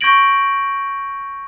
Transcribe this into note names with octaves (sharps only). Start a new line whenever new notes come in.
C#6 G6 G#6 A#6 D7 F#7